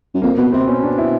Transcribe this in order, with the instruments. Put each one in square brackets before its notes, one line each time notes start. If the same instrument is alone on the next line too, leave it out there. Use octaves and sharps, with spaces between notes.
[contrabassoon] F#2
[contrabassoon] F2 [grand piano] A#3
[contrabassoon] B2 [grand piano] B3
[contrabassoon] C3 [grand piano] C4
[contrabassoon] B2 [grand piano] C#4
[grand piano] D4
E4